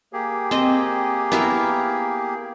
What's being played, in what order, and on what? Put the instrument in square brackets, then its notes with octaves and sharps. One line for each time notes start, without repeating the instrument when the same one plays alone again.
[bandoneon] A#3 G4 G#4
[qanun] C4 D#5
B3 E4 A#4